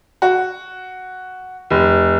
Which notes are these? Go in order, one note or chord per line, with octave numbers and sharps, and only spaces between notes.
F#4
F1